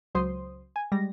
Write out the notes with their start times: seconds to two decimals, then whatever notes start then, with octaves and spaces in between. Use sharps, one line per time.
0.15 C#2 F#3 C5 C6 D#6
0.76 G#5
0.92 G3 G#3 A#6